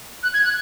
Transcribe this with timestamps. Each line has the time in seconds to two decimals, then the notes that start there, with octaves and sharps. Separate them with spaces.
0.23 F#6
0.34 G#6
0.44 F#6